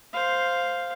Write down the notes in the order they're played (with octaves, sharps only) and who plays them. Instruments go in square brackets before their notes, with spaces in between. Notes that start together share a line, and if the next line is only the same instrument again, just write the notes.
[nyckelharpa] C5 F5